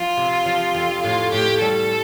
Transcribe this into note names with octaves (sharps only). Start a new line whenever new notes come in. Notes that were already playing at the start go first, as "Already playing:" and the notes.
Already playing: F3 F4
C3
F3
F2
A2 F4
A2 G4
G3 A4